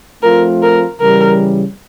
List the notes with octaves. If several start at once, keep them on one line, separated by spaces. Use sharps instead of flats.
F3 A3 C4 F4 A#4
A#4
C#3 E3 G3 A#4